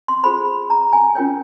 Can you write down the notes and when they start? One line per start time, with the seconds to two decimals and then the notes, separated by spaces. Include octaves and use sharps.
0.08 C6
0.23 F4 G#4 C5 B5
0.70 A#5
0.93 G#5
1.15 C#4 F4 A#4 C#5 G5